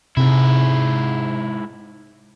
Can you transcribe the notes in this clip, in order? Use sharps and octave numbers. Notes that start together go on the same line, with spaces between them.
G#2 C3 E4